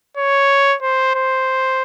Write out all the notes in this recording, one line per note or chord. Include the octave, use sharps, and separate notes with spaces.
C#5
C5
C5